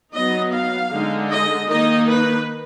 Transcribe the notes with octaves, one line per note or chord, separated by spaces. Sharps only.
F#3 B3 D#4 D#5
F5
D3 G#3 D#4
D#5
D#3 A#3 D#4 D#5
B4